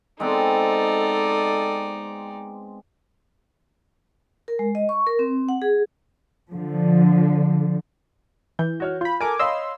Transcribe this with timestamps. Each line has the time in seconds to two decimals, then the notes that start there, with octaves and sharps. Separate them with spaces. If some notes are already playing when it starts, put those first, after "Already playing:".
0.20 G#3 B3 C4 D#4 A4 D5
4.48 A#4
4.59 G#3
4.75 D#5
4.89 C#6
5.07 A#4
5.19 C4
5.49 F#5
5.62 G#4
6.51 D3 F3
8.59 E3 G6
8.80 F#4 C#5 F6
9.01 F4 B5 G6
9.20 A4 A#4 G#5 D6
9.39 C#5 D#5 F5 B5 C6 E6